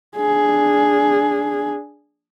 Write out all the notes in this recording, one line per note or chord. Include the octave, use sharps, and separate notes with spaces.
D4 G#4